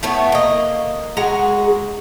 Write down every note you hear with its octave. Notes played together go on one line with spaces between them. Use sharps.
A2 A3 B3 C#5
A#3 D#5
G#3 F#4 G#4 A#5